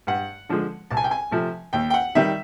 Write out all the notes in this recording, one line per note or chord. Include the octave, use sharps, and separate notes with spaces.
G2 F#5
D3 F3 G#3
C2 A5
G#5
G5
G#5
C3 F3 A3
D#2 G5
G5
F#5
D#3 G3 E5